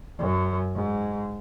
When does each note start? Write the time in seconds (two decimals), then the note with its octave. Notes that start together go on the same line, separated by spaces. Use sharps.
0.19 F#2
0.75 G#2